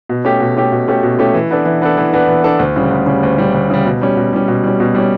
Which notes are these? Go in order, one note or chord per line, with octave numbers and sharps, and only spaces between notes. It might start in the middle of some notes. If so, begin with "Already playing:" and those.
B2
A3 C#4 G4
B2
A3 C#4 G4
B2
A3 C#4 G4
B2
A3 C#4 G4
E3
B3 D4 A4
E3
B3 D4 A4
E3
B3 D4 A4
E3
B3 D4 A4
D2
C#3 G3
D2
C#3 G3
D2
C#3 G3
D2
C#3 G3
B2
G3 C#4
B2
G3 C#4
B2
G3 C#4
B2
G3 C#4